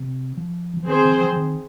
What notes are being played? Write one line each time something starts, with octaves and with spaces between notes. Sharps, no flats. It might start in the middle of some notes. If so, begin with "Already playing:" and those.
Already playing: C3
F3
F3
D#3 C4 G#4 C5
D#3
F3
F3
D#3